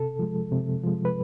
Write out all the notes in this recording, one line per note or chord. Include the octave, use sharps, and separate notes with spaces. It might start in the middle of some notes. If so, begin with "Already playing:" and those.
Already playing: C3 A4
F3 G#3
C3
F3 G#3
B4